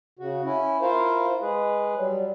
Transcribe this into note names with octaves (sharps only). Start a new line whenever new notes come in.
C#3 F#4
C#4 E4
E4 F4 A#4 C5 F5
G#3 G#4 B4
F#3 G3